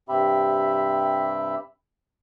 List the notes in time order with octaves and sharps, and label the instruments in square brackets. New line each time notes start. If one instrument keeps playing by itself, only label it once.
[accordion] G2 C3 C4 G4 E5 B5